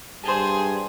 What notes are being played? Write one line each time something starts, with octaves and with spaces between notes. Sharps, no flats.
G2 G#4 C5 A5